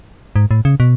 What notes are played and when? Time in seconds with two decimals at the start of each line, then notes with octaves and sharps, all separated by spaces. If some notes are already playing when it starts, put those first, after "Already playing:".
0.36 G#2
0.51 A2
0.65 C#3
0.80 B2